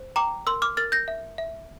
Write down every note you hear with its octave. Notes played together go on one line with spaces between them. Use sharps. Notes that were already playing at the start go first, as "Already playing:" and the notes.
Already playing: C5
G5 A#5 D6
A#4 C6 E6
D6 F6
A#4 F6 A6
G6 A#6
E5
E5